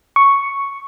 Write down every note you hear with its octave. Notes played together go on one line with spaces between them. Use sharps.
C#6